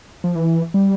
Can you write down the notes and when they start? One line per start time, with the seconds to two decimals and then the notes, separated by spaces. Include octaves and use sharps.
0.24 F3
0.35 E3
0.74 G3